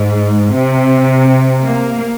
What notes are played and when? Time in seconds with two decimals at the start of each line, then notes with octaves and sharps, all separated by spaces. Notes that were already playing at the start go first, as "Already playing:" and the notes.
Already playing: G#2
0.53 C3
1.62 A#3